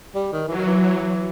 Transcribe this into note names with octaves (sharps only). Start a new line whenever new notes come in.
G3
D#3
E3 F#3
D#3
E3
F#3